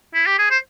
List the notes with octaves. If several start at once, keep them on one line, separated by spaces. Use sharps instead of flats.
E4
G4
G#4
C5